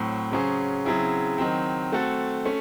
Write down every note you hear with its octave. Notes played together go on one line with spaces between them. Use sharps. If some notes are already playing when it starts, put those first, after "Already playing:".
Already playing: A2 F#3 C4
C#3 F#3 C#4 G#4 C5
C#3 F#3 C4 E4 G#4
D#3 F#3 C4
A3 C4 F#4 A4
A3 C#4